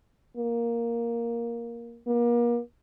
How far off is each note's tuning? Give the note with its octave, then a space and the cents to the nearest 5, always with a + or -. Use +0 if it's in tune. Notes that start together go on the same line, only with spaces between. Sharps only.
A#3 +5
A#3 +35